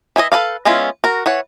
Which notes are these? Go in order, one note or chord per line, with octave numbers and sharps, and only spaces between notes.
E3 E4 G#4 D#5
A4 B4 D5 F5
G#3 B3 C#4 E4 F4
F#4 A#4
E3 C#5 F#5